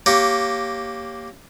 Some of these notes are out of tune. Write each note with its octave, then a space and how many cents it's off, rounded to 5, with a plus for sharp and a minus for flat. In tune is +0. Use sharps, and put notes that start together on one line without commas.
A#3 +0 G4 +0 C#5 +0